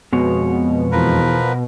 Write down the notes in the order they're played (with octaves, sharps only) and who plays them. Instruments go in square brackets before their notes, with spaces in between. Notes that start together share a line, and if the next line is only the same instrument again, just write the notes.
[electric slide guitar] F2 G#3 C#5 [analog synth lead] B2
[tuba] E2 [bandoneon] F3 A#4 B4